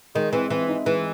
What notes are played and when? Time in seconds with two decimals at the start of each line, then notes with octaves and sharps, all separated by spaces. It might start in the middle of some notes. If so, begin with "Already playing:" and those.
0.15 D#3 G#3
0.32 E3 C4
0.50 E3 C4
0.69 D#4
0.86 E3 G#3